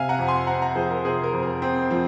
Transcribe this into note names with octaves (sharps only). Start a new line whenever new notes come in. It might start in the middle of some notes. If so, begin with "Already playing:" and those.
Already playing: C3 F5 G#5
F#5 A#5
F2
G#5 C6
C4 F#5 A#5
F#5 A#5
F3 G#4 C5
A#4
C3 G#4 C5
A#4
F2
A#4
C4
F3